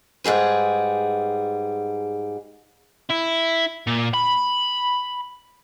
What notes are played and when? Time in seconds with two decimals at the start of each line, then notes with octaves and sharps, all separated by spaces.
0.24 G#2 G3 G#4 B4
3.10 E4
3.87 A#2
4.14 B5